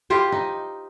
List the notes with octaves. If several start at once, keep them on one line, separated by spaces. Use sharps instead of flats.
E4 F4 G4 C5
D#4